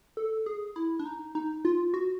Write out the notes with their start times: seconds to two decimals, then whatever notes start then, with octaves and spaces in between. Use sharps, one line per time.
0.17 A4
0.46 G#4
0.76 E4
0.99 D4
1.06 D#4
1.35 D#4
1.65 F4
1.94 F#4